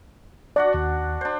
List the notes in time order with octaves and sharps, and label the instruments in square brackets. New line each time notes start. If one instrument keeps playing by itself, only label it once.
[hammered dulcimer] D4 F#4 F#5 [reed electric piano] D5
[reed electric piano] D#2
[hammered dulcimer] D4 C5